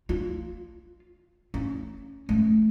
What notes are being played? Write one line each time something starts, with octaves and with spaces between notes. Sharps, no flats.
F4
C#4
A3